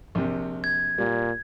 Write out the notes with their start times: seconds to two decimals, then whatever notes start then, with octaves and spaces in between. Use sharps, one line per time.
0.15 A#1 C3
0.64 G#6
0.98 A#2 G3